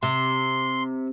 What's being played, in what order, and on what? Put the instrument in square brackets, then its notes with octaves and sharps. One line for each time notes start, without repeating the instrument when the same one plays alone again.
[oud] C3 [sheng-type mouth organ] C6